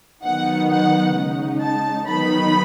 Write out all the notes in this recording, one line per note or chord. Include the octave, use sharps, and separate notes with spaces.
D#3 F#3 B3 D#4 F#5
F#5
C#3 G#3 D#4
A5
D#3 F#3 B3 D#4 B5